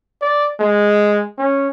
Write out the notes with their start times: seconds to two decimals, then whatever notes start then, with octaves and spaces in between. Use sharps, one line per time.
0.22 D5
0.60 G#3
1.38 C#4